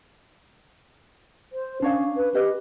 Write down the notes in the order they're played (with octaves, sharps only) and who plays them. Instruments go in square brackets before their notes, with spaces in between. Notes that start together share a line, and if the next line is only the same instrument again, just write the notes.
[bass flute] C5
[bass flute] C#4 [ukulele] D4 C#5 F5
[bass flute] B4
[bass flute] G4 [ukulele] B4 D#5